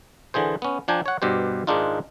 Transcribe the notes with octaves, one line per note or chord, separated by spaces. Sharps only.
D3 E3 G#4 C5
B3 C#4
F3 D4 G5 G#5 A#5
C#5 F#5
G2 B2 G4 C5
G#2 D#3 G#3 D4 D#4 F4